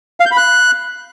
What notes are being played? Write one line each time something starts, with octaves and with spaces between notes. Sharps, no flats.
F5
G6
B5
F#6